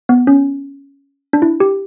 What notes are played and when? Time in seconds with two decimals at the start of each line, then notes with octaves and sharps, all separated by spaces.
0.09 B3
0.27 C#4
1.33 D4
1.42 E4
1.60 G4